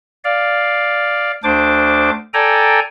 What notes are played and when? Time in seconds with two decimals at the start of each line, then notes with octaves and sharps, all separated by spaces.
0.24 D5 F5
1.44 D2 D4 C5 D6
2.34 A4 D5 G5 G#5 A#5